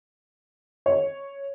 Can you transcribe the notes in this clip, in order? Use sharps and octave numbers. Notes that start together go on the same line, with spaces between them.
C#5